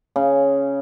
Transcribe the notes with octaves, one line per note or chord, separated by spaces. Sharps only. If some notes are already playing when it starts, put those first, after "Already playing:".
C#3